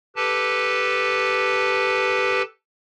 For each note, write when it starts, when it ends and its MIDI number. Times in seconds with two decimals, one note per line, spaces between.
0.16 2.42 67
0.16 2.42 69
0.16 2.42 71
0.16 2.42 81